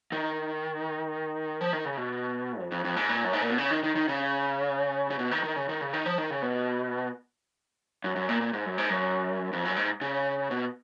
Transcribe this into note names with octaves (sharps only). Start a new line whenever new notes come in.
D#3
F3
D#3
C#3
B2
F2
F2
F2
G#2
A#2
F#2
G#2
A#2
B2
C#3
D#3
D#3
D#3
C#3
C#3
B2
D#3
D#3
C#3
D#3
C#3
D#3
F3
D#3
C#3
B2
F#2
F#2
A#2
A#2
G#2
F#2
G#2
F#2
F2
F#2
G#2
C#3
B2